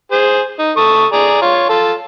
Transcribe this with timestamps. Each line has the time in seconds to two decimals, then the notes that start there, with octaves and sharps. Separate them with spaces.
0.11 G#4 C5
0.59 D#4
0.77 A4 C#6 D#6
1.12 G#4 D5 A#5
1.42 F4 C#5
1.69 F4 A4